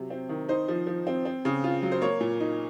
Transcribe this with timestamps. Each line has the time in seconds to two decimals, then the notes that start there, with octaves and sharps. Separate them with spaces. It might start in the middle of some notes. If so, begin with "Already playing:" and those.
Already playing: C3 F#3
0.10 C4
0.29 D#3
0.49 D#4 C5
0.68 F3
0.87 F3
1.07 C4
1.25 C4
1.45 C#3
1.64 F4
1.82 F#3
1.92 C5
2.01 A#3 C#5
2.20 A#2
2.40 D#4